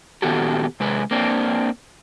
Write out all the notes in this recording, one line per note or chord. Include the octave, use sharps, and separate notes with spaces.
A#2 D#3 B3 F#4 G4 A4
C3 G#3 B4
A#3 C4 D4